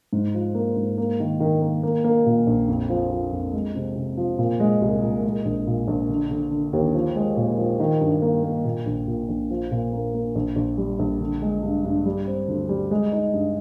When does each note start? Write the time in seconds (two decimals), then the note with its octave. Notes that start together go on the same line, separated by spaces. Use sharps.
0.13 G#2
0.34 F3
0.55 A#3
0.77 G#2
0.98 A#3
1.20 D#3
1.40 D#3
1.62 A#3
1.83 A#3
2.04 A#3
2.26 A#2
2.47 A#1
2.68 F2
2.90 F3
3.11 F3
3.32 F2
3.53 G#3
3.75 C3
3.96 C3
4.17 F3
4.39 A#2
4.60 G#3
4.81 C2
5.03 A#2
5.24 G#3
5.45 A#1
5.67 A#2
5.88 A#1
6.09 D3
6.31 D3
6.51 D3
6.73 D#2
6.94 F3
7.16 G#3
7.37 A#2
7.58 F3
7.80 D#3
8.01 G2
8.22 A#3
8.44 A#3
8.65 A#2
8.86 A#1
9.07 A#2
9.29 A#1
9.50 F3
9.71 A#2
9.93 A#3
10.14 A#3
10.35 A#1
10.56 A#1
10.78 G3
10.99 A#1
11.20 D3
11.42 G#3
11.63 G2
11.84 G2
12.06 G3
12.27 C4
12.48 D2
12.69 G3
12.91 G#3
13.12 D#4
13.34 G2